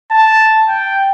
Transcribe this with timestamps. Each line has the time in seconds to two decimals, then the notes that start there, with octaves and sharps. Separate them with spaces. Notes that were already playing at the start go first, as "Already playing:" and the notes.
0.11 A5
0.68 G5